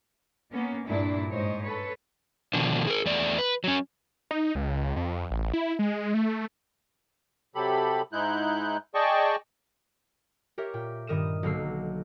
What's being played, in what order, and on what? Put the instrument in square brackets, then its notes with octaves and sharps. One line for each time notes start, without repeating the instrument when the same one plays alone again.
[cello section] A#3 B3 C#4
G2 A#2 D4 E4
G#2 C5 C#5 D#5
A4 B4 C#5
[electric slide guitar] B2 D3 D#3 F3 D4
G#4 A#4
E2 A3 D5
B4
F#3 C#4
[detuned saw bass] D#4
C#2
F2
A1
E4
G#3
A3
[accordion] C3 F#3 G4 A4 B5
G#2 G#3 D#4 E4 F#6 G6
G#4 D5 D#5 G5 A5 C#6
[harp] G4 A#4 C#5 E5
A#2 G5
G2 D#3 A#4 D#6 D#7 E7
B1 D3 F#3 A#3 E6 C7